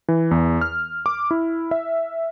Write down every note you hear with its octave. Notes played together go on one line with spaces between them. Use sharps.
E3
E2
F6
D6
E4
E5